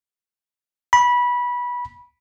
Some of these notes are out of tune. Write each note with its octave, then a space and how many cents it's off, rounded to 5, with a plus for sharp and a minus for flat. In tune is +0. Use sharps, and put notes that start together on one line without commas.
B5 -20